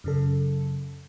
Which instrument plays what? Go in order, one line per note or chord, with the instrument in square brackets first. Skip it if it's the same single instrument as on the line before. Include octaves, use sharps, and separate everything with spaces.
[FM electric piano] F#2 C#3 A4